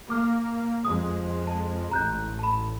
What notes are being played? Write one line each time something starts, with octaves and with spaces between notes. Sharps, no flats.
A#3 D6 F6
F2 G#3 D#6
A5
A1 A#5 F#6 G6
A5 B5